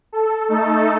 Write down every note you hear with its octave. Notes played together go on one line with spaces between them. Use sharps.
A4
A3 D#4 A4